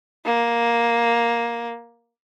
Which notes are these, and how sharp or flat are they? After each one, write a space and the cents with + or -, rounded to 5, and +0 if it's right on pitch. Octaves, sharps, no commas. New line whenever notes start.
A#3 +5